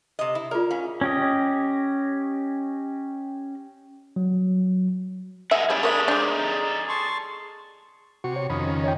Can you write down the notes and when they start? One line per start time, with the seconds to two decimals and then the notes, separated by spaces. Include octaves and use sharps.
0.19 C3 D#5
0.35 E4
0.51 F4 G#4 A#4 D5
0.71 C#4 F5
1.01 C#4 G4 D#5
4.16 F#3
5.51 G#4 A#4 D#5 E5 F#5
5.70 G3 C#4 E4 G#4 A4 D5
5.83 D4 A#4 C#5 E5 B5 D#6
6.08 G#3 D4 C5 D6
6.25 D#4
6.89 A5 C6 C#6
8.24 C3 F#4 C#6
8.36 C#5
8.50 F2 D#3 C#4 B5 D#6
8.67 C#3
8.84 C#5 D#5 G5